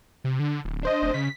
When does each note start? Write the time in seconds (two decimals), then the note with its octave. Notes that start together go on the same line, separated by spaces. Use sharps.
0.24 C3
0.40 D3
0.65 D1
0.83 D4 C5 D#5
1.02 F1
1.14 C#3 B6